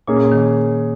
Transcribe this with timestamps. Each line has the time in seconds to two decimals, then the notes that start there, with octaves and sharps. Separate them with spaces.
0.07 A#2 A#3 C#4 G#4
0.32 D#3